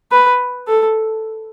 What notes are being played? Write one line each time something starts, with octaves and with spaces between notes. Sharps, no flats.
B4
A4